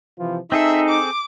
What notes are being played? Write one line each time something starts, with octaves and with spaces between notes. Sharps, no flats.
C3 E3 F3
C4 D#4 G#4 A4 E5
D6